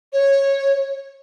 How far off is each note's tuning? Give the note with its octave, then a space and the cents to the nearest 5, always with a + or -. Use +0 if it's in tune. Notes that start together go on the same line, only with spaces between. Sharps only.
C#5 -10